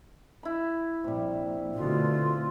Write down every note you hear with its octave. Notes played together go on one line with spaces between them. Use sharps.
E4 B5
A#1 C3 G3
B2 D3 A3 F4